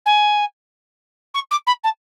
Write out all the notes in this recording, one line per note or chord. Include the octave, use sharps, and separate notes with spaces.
G#5
C#6
D6
B5
A5